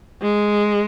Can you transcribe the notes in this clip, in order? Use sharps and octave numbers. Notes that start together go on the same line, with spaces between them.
G#3